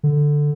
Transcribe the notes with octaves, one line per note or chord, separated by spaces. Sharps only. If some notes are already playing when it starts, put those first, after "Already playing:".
D3